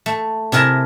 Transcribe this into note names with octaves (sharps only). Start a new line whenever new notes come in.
A3
C3 E4 A#4 G#5 A5